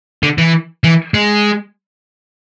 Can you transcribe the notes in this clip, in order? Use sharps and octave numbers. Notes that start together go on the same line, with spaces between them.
D3
E3
E3
G#3